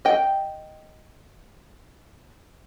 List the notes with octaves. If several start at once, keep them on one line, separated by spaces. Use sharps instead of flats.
D#5 G5